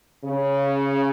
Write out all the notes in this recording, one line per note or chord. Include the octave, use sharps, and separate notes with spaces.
C#3